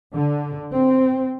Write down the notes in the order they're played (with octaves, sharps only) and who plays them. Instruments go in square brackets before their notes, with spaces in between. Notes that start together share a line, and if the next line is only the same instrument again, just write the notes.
[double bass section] D3
C4